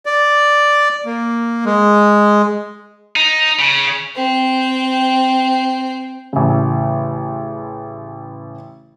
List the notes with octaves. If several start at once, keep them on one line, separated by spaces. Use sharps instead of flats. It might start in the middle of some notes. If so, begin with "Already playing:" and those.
D5
A#3
G#3
D#4
C#3
C4 G5
A1 C#3